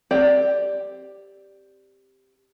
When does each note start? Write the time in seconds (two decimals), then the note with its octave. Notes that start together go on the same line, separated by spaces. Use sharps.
0.11 C4 G4 D5